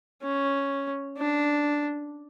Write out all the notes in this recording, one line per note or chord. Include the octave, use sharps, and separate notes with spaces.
C#4
D4